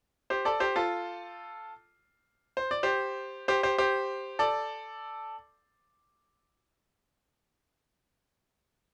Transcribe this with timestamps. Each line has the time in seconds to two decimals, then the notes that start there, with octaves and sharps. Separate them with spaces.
0.30 G4 C5
0.45 A4 D5
0.60 G4 C5
0.76 F4 A4
2.57 C5
2.71 D5
2.83 G4 C5
3.48 G4 C5
3.63 G4 C5
3.78 G4 C5
4.39 A4 D5